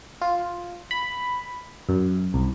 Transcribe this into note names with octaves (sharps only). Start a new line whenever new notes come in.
F4
B5
F#2
C2